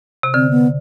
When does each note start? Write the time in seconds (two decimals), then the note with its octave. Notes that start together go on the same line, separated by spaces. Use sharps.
0.23 C3
0.34 D3 C4
0.50 B3